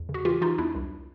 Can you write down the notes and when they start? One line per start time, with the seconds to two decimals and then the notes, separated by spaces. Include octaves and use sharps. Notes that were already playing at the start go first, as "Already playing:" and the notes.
Already playing: E2
0.09 C#3
0.14 F#4
0.25 E3 F4 G4
0.41 E3 D#4 F4
0.58 E2 D4 E4
0.75 C2